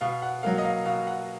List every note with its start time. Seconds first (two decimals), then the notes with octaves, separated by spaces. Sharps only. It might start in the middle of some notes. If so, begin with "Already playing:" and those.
0.01 B2 F5
0.22 F#5
0.43 F#3 A#3 F5
0.58 D#5
0.64 F5
0.85 B2 F5
1.07 F#5